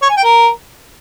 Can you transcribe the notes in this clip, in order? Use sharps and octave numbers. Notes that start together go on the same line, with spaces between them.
C#5
G#5
G5
A#4